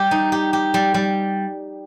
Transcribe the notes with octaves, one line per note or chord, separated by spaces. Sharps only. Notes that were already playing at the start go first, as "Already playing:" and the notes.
Already playing: G3 G4
D#4
G4
G4
G3
G3